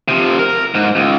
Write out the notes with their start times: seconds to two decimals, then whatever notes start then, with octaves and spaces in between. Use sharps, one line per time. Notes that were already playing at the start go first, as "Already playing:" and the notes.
0.08 C3 F3
0.39 A#4
0.74 G#2
0.96 C#2